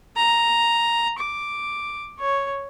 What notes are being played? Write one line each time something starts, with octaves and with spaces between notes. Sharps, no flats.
A#5
D6
C#5